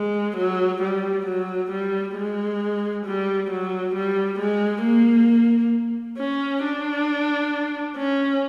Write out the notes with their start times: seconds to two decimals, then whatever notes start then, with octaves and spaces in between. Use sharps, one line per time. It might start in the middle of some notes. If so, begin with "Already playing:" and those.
Already playing: G#3
0.37 F#3
0.82 G3
1.26 F#3
1.71 G3
2.16 G#3
3.05 G3
3.50 F#3
3.95 G3
4.39 G#3
4.83 A#3
6.18 C#4
6.63 D4
7.97 C#4